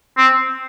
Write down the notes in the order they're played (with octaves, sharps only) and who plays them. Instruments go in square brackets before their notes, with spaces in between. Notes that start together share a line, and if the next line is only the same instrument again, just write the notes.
[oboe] C4